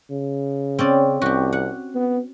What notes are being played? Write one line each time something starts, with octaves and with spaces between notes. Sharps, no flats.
C#3
C4 C#4 D5
C2 F#4 G4
F#5
B3